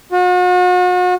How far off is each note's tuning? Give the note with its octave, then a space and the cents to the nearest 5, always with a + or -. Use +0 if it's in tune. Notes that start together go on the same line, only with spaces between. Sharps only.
F#4 -40